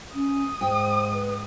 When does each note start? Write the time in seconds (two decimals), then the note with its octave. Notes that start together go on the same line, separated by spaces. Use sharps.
0.14 C#4 D#6
0.61 G#2 C5 G5
1.13 B4